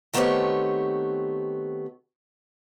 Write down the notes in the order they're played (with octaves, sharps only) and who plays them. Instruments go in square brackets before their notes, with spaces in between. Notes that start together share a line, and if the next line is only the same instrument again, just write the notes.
[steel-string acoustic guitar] D#3 A3 B3 C4 G4 C#5